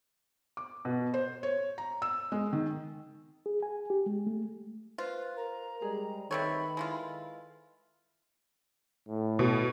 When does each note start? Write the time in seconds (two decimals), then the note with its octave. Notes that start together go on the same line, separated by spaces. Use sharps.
0.57 D6
0.85 B2
1.14 C5
1.43 C#5
1.78 A#5
2.02 E6
2.32 G#3
2.53 D#3
3.46 G#4
3.63 G#5
3.90 G4
4.06 G#3
4.27 A3
4.98 F4 B4 C5
5.37 A#4 A#5
5.82 G3 G#3 G#4
6.31 C3 D#3 C4 A4 B4 C#5 B5
6.77 G#3 E4 F4
9.09 A2
9.39 B2